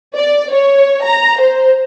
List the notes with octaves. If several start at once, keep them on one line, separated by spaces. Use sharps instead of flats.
D5
C#5
A#5
C5